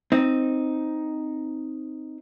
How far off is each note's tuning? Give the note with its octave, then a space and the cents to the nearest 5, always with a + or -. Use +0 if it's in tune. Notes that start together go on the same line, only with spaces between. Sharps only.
C4 +0 D#4 +0